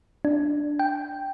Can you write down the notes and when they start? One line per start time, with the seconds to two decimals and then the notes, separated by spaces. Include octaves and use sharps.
0.25 D4
0.79 G5